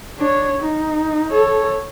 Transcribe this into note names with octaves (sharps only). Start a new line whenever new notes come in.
D4 C#5
D#4
A4 C#5